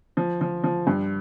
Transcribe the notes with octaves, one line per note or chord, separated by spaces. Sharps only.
F3
F3
F3
G2